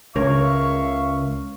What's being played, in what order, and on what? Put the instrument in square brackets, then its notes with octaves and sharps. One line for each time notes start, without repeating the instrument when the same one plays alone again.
[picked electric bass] C#2 [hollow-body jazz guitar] C#3 A#4 C#5 [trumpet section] E5 F5 C#6